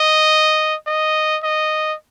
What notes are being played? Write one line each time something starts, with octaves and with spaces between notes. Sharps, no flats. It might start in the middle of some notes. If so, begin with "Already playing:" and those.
Already playing: D#5
D#5
D#5